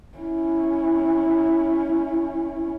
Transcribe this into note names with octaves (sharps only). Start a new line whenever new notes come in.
C#4 E4